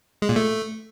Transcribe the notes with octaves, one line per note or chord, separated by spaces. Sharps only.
G#3
A#2
A3